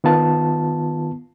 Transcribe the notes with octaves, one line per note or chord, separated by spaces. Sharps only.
D#3 B3 F4 A5